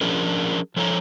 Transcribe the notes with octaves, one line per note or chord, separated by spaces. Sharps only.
F3 C#4 D4 G#4 A#4
F3 A4 C#5 G5 A#5